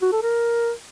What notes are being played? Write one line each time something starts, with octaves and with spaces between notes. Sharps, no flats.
F#4
A4
A#4